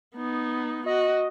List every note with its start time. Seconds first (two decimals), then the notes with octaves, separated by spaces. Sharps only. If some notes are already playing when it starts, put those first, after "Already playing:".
0.16 B3 D#4
0.86 F#4 D#5